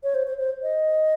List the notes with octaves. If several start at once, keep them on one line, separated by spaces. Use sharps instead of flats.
C#5
C5
C5
C5
D#5